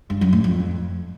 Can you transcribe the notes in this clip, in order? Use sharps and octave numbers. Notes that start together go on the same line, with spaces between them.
G2
F#2
A2
F2